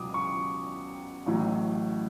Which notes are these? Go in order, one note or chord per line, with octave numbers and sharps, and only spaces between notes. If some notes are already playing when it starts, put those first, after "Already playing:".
Already playing: C#2 B2 F#3 D6 D#6
C#6
A1 A2 F#3